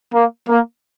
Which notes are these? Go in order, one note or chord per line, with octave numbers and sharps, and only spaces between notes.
A#3
A#3